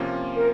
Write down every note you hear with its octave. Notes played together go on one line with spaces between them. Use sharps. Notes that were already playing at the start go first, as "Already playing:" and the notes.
Already playing: C3 F3 A#3 C#4 F4
A#4